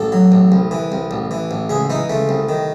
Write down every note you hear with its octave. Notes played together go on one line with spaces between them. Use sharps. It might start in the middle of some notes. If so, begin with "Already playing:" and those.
Already playing: A1 A4
F#3
A1
C2
E3
C2
A1
E3
A1
C#2 G#4
E3 D#4
C#2 A3
C2
D#3